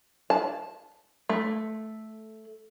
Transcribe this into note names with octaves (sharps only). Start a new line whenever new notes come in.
A5
A3